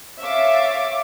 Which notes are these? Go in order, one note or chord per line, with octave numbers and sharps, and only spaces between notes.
C#5 E5 F5 D6 A6